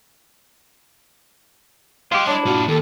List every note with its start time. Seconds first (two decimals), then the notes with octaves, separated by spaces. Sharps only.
2.12 F4 G4 D#5 C6
2.27 D4 E4 C#5
2.46 A2 F4 F#4
2.68 D#2 A4